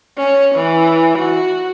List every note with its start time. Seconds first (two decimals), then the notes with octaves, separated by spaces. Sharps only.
0.18 C#4
0.55 E3
1.19 F#4